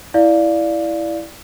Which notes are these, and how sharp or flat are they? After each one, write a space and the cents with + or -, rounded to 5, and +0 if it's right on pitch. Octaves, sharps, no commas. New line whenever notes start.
E4 +0 D5 +0 F5 +0